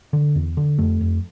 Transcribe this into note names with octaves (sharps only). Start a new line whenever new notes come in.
D3
E2
D3
F2 A3
F2